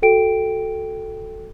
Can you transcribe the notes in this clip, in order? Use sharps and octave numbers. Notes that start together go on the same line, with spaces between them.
F#4 A4 G5 D7